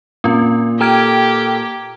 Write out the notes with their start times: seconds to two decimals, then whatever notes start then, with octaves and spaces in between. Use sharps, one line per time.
0.24 A#2 C4 C#4 F4
0.81 G4 A4 G5 A#5 F6 G#6 D7